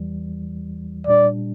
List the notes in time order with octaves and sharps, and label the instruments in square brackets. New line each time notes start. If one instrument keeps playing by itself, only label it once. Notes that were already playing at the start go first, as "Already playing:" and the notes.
Already playing: [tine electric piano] E2 E3 G3
[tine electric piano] A#2 G3 D4 [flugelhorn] D5